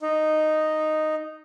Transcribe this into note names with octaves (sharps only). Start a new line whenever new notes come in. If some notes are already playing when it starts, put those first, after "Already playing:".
D#4